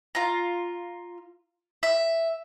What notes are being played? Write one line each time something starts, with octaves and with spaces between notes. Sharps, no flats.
F4 A#5
E5